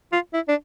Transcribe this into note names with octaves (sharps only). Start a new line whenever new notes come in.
F4
E4
D4